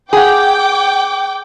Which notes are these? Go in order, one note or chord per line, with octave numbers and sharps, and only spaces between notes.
G#4 F#5 G5 D6